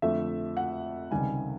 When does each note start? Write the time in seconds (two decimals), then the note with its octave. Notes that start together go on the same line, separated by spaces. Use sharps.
0.02 F2 D3 F3 A3 E5
0.57 F#5
1.11 C#2 C3 D#3 G3 G#5